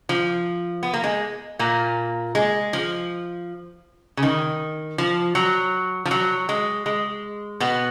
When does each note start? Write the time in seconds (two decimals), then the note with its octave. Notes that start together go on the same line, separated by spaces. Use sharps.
0.09 F3
0.83 B3
0.94 A#3
1.04 G#3
1.59 A#2 A#3
2.35 G#3
2.73 F3
4.17 C#3
4.23 D#3
4.98 F3
5.35 F#3
6.05 F3
6.11 F#3
6.49 G#3
6.86 G#3
7.60 B2 B3